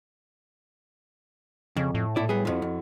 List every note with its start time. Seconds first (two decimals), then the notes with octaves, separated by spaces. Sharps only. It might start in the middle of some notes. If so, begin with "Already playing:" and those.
1.77 F2 C#3
1.95 A2
2.16 A#2 E4 A4 D5
2.29 F#3 G3 B3 G#4
2.45 F2 F3 E4 F#4
2.62 F2